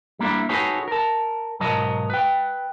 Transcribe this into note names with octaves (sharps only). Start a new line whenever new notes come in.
G3 A#3 D4 E4
D#4 F#4 G#4 A4 B4 C#5
A#4 A5
B1 G#2 F#3 A#4 D#5 A5
B4 G5